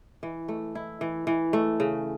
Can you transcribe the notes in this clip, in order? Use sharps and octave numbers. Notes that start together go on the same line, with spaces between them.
E3
A3
E4
E3
E3
A3
C#3